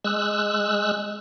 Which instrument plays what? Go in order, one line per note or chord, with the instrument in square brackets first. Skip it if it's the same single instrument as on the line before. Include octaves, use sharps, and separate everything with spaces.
[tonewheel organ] G#3 E6 F#6